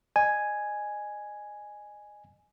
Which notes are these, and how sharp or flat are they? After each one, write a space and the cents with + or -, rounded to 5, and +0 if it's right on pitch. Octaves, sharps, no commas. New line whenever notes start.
D#5 -35 G#5 +0